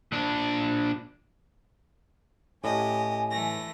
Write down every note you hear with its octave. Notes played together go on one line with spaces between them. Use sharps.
A#2 D4
A2 C#4 G4 D#5 G#5
E3 A3 A#6